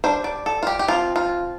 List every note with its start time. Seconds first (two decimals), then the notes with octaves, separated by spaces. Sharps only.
0.04 G3 D4 C5
0.24 D5
0.46 A4
0.63 F4
0.67 G4
0.79 G4
0.88 F3 C4 F4
1.16 F4